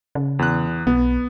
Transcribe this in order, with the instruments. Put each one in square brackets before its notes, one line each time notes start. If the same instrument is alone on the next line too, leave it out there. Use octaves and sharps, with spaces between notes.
[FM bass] C#3
[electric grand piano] E2 F#6
[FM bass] B1 [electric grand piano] B3